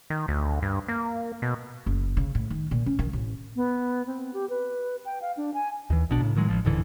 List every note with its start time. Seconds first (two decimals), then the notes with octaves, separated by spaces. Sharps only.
0.10 D#3
0.28 D2
0.62 G2
0.88 A#3
1.42 B2
1.86 F#1
2.17 C#3
2.35 A2
2.50 D#3
2.71 A#2
2.86 C#4
2.99 D#3
3.13 A1
3.56 B3
4.07 C4
4.34 G4
4.49 B4
5.05 G5
5.22 F5
5.37 D4
5.54 G#5
5.90 D#2 E3
6.09 A#1 B2 D4
6.20 A2 C#3
6.35 A2 D#3 F#3 G#3
6.48 A1 F3
6.65 D1 G#2 D3 E3